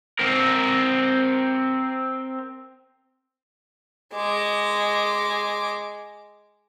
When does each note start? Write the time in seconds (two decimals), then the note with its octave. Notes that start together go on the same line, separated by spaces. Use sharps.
0.19 C4 A#4
4.14 G#3 D6